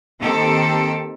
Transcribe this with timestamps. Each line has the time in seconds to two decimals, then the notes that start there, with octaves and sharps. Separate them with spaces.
0.21 D#3 A#3 C4 G4 A4